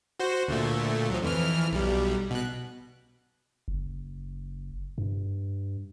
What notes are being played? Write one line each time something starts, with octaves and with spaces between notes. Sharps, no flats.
F#4 C5
D2 A#2 A3
F3 F#3
F2 E3 F6
B1 G3
B2 F#6
F#1
G2